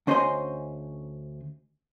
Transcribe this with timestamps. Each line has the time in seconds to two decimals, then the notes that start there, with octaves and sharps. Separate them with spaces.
0.07 D2 C#4 C5 D#5 G#5 C6